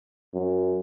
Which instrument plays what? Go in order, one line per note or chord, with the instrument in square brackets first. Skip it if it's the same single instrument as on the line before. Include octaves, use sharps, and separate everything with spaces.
[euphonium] F#2